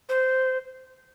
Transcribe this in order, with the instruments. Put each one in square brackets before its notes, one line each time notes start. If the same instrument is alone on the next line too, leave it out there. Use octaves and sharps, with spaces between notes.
[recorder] C5